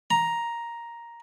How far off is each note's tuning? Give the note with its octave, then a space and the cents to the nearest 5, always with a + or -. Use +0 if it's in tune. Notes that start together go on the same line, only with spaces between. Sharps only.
A#5 +5